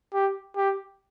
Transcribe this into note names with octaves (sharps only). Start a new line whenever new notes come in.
G4
G4